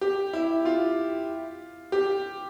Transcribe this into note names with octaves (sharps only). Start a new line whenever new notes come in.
G4
E4
F4
G4